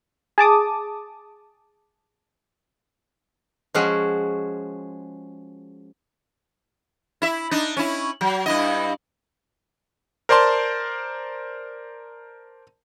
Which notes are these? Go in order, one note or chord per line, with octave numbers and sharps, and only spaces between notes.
G#4 A5 D6 D#6
F3 G#3 C#4 F#4 G#4
E4 E5
D4 D#4
C#4 E4
F#3
G2 E4 D#5
A#4 C5 D5 A5 C6